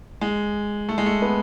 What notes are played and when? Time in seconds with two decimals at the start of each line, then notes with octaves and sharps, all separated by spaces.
0.21 G#3
0.89 A3
0.98 G#3
1.06 A3
1.22 B3